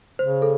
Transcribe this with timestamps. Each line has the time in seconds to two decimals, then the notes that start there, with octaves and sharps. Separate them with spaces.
0.19 C#3 C5
0.42 A4